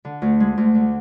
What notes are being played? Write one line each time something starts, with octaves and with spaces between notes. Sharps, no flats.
D3
D2
G#3
D2
D3